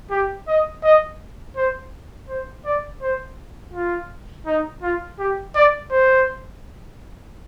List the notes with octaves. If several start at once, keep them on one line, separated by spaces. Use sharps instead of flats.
G4
D#5
D#5
C5
C5
D5
C5
F4
D#4
F4
G4
D5
C5